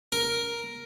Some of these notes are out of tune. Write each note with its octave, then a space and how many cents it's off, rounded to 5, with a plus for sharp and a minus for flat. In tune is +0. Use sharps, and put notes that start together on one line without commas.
A#4 +5